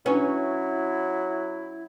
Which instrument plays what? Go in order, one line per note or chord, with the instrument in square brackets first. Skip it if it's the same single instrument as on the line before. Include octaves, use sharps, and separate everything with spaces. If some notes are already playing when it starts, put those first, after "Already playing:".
[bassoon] F#3 [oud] C#4 [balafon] D4 B4 [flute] E4